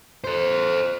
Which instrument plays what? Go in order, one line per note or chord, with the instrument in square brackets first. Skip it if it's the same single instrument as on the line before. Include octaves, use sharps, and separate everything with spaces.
[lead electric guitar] A4 C5